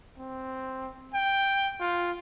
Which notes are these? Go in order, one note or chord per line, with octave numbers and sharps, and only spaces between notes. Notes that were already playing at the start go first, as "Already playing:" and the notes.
C4
G5
F4